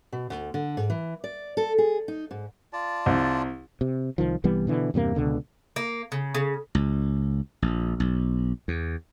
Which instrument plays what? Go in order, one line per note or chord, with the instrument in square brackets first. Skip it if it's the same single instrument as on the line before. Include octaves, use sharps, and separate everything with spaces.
[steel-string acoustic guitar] B2
D2
D3
G#2
E3
D5
A4
G#4
D#4
G#2
[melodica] F4 D5 A5
[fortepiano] C2
[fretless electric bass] C3
C2 D#3 F3
C2 E3 G3 B3
B2 D3 E3
E2 G2 C3 A#3
C#2 B2 D3
[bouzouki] A#3
C#3
C#3
[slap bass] C#2
A#1
B1
E2